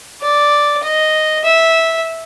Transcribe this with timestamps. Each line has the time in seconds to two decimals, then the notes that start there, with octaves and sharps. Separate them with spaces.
0.22 D5
0.83 D#5
1.45 E5